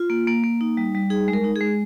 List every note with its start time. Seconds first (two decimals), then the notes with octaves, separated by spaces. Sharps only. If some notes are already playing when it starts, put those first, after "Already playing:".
Already playing: F4
0.10 A#3
0.27 A#3
0.44 A#3
0.61 D#4
0.77 G3
0.95 G3
1.10 D#4 G#4
1.28 G#3
1.33 A#4
1.44 D#4
1.55 G#4
1.61 G#3